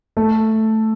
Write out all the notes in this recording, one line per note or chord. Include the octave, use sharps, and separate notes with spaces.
A3 A4